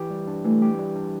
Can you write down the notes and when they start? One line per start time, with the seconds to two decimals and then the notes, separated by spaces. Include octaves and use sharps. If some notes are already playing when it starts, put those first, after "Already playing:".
Already playing: E3 G4
0.10 G3
0.27 D4
0.44 E3 A3
0.62 G4
0.79 G3
0.96 D4